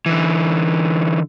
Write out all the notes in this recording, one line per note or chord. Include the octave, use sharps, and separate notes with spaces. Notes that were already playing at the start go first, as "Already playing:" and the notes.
D3 E3